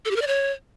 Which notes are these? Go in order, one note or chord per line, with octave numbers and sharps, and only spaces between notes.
A4
G4
A#4
D5
C#5